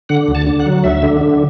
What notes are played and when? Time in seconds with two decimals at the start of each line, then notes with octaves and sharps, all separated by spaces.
0.09 D3 F#5
0.28 D2
0.35 A5
0.47 D3
0.60 F#5
0.66 F#3
0.84 D2 E5
1.03 D3
1.21 D3